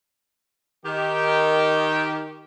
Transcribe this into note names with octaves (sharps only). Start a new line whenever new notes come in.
D#3 G4